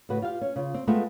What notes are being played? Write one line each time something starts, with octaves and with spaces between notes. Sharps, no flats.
A2 C#3 F#4 B4
F4 G4 F5
C#4
C#3 F4
C4
G#3 A3 B3 F4 E5 G5